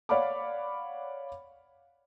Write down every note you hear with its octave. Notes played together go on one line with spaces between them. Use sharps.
C#5 D5 F5 F#5 B5 D6